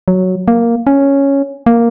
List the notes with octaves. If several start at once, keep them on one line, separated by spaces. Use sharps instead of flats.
F#3
A#3
C#4
A#3